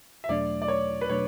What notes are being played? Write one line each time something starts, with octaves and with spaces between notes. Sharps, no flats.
E5
E2 B2 F#3 A3 D4 D5
D5
C#5
B4
B2 F#3 A3 D4 C#5